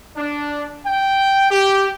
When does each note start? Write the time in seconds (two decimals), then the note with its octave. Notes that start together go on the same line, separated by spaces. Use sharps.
0.17 D4
0.84 G5
1.50 G4